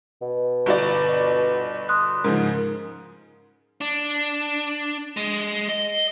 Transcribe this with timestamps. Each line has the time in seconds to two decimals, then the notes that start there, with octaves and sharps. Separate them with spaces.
0.22 B2
0.66 G1 F#4 D5
1.89 C6 D#6 F#6
2.24 G#2 C#3 F3 A#4
3.81 D4
5.17 G#3
5.69 D#5